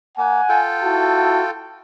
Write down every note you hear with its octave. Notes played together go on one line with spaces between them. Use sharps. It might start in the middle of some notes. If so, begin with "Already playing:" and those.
A#3 F#5 G#5
F4 A4 G5
E4 F#4 A5